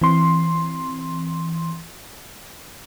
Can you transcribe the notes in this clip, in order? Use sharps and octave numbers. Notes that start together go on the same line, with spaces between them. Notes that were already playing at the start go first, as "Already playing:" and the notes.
E3 C4 C6